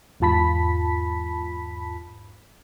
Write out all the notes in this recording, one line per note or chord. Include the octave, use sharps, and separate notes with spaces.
E2 G#2 F4 A5 B5 B6